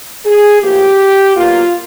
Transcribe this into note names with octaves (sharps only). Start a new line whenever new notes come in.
G#4
A2 F3 A#3 G4
B2 F#3 A#3 F4